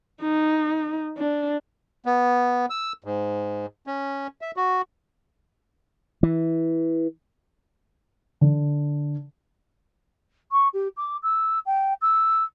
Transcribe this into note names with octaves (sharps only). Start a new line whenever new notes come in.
D#4
D4
B3
E6
G#2
C#4
E5
F#4
E3
D3
C#6
G4
D6
E6
G5
E6